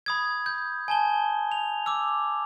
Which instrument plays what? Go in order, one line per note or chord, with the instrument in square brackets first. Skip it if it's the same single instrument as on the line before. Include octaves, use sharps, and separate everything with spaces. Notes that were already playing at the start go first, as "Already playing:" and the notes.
[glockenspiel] B5 D#6 G#6
G6
G#5 A5 G7
F7
D6 E6